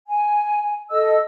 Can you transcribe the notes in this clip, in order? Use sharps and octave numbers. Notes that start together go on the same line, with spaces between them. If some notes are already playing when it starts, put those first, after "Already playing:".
G#5
A4 D#5 E6